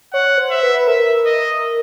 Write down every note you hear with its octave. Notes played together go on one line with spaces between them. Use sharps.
C#5 F#5
C5
E5
B4
A#4 E5
D#5